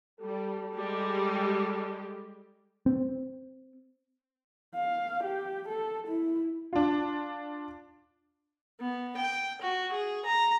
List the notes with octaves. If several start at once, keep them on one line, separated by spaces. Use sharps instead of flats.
G3 A4
G3 G#3 G4
C4
F5
G4
A4
E4
D4 F4
B3
G5
F#4
G#4
A#5